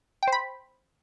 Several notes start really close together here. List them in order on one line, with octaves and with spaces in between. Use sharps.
G5 C5 B5